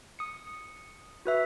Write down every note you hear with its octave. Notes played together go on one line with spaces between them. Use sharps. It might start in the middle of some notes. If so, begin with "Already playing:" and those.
D#6 C#7
F#4 B4 E5